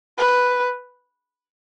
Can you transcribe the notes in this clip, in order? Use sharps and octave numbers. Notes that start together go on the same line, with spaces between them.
B4